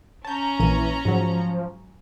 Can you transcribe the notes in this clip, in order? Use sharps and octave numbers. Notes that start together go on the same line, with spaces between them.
C#4 A5 A#5 G6
A#1 A#2 E3 D#7
G#2 F3 F#3